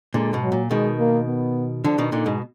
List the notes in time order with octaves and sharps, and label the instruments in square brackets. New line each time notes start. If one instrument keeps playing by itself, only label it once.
[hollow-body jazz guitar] A#2 D3 [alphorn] G#3
[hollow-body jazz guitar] G#2 B2
[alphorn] F#3
[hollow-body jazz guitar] A#2
[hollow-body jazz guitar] B2 D#3 [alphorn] G#3
[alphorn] A#3
B3
[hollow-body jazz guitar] D3 F3 [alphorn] D4
[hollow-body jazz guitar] B2 D#3
[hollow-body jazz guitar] A#2 D3 [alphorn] D#4
[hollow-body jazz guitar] G#2 B2